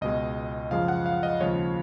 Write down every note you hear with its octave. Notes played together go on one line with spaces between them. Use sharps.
C#2 B2 G#3 D#5
F#2 C#3 F3 G#3 F5
F#5
F5
D#5
D#2 C#3 F3 G#3 C#5